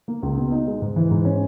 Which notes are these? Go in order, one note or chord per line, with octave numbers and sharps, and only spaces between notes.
A#3
C#2
B2
D#4
G#3
G#2
E3
G#2
C#4